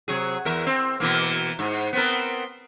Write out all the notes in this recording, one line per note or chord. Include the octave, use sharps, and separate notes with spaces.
C3 F#3 G#4
E2 A#4 E5
C4
B2 E3 A#3
G#2
B3 C4 A#4